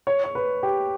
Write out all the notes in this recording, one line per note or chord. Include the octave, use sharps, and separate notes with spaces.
C#5
C#5
B4
G4